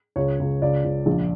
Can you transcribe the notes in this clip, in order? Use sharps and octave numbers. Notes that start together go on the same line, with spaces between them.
C#2 C#5
C#2
C#2 D5
C#2
A#1